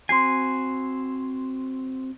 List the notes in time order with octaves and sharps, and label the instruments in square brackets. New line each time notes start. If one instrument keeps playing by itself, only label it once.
[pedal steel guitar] C4 F#4 G#5 [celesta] C6 C7